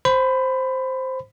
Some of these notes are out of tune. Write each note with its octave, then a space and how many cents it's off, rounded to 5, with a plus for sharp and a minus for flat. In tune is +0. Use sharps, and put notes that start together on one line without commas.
C5 +0 B5 +20